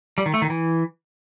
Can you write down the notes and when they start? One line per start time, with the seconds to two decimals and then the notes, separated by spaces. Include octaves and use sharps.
0.18 G3
0.26 D#3
0.34 A3
0.42 D#3
0.50 E3